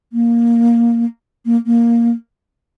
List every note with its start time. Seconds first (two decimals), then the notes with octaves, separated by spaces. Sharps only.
0.13 A#3
1.46 A#3
1.66 A#3